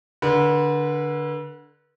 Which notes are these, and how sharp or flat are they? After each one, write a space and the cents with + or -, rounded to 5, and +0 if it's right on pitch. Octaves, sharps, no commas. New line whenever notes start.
D3 +0 B4 -40